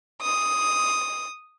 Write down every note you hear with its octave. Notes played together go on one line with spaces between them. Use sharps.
D#6